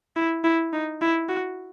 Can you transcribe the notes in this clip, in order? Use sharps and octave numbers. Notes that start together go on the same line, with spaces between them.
E4
E4
D#4
E4
F#4